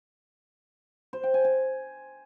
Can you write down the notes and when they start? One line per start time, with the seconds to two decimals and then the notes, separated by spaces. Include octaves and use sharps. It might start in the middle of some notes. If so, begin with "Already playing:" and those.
1.13 C5
1.23 G5
1.34 G#5
1.44 G#5